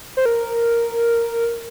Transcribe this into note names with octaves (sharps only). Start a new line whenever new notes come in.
C5
A#4